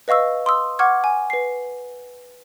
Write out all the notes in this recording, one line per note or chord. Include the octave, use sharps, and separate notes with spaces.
B4 D#5 F5 C#6 E6
C6 D#6 E6
F#5 C#6 D6 F6 G#6
G#5
B4 C7